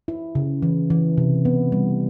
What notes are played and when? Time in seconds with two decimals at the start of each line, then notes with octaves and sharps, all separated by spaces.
0.08 E4
0.35 C#3
0.62 E3
0.90 E3
1.18 C3
1.45 B3
1.72 G3